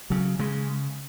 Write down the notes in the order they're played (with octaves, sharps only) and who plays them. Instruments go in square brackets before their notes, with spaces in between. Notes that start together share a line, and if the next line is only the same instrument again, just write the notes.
[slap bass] C#3 F#3
C#3 G#3